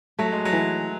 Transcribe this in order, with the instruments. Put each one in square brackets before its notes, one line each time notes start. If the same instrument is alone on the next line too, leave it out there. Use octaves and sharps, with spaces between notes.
[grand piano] F#3 [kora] A3
[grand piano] G#3
F#3
[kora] E3